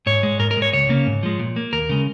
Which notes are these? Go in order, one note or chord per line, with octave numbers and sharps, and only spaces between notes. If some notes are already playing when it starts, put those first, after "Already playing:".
G#2 C#5
G#3
G#2 A#4
A#4
G#3
C#5
C#2 C#5
C#3 A#3
G#2
F3 G#3
A#2
A#3
D#2 A#4
C#3 G#3